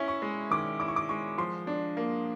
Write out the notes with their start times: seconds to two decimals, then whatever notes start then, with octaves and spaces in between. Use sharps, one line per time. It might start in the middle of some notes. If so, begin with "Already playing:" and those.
Already playing: C#4 E4
0.08 C#6
0.22 G#3
0.51 D#3 D6
0.80 E4 D6
0.88 C#6
0.96 D6
1.09 G#3 C#6
1.38 F3 C6
1.67 D4
1.97 A#3